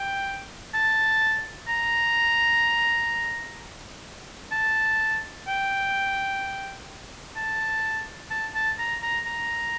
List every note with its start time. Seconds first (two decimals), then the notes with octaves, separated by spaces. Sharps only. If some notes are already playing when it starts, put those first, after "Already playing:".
Already playing: G5
0.74 A5
1.68 A#5
4.52 A5
5.48 G5
7.36 A5
8.31 A5
8.55 A5
8.79 A#5
9.03 A#5
9.26 A#5